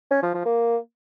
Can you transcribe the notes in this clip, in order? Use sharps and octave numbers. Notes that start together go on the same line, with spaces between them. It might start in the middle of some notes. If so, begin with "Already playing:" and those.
C#4
F3
F3
A#3